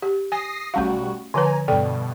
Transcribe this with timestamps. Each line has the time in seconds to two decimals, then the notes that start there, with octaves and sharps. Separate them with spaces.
0.02 G4
0.32 G#5 D#6 A#6 C7
0.74 B1 G3 A3 C#4 F#4 F5
1.34 D3 F3 B4 G#5 A#5
1.68 G2 B2 A4 D5 G5